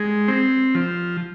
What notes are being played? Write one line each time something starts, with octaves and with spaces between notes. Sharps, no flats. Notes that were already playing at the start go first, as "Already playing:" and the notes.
Already playing: G#3
C4
F3